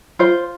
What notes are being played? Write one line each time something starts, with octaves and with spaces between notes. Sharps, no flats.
F4 C5